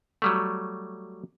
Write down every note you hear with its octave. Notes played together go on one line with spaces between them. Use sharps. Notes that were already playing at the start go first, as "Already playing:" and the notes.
F#3 G3 A3